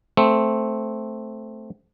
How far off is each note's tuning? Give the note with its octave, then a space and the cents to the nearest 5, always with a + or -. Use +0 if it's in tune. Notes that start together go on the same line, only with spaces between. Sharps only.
A3 +0 C4 +0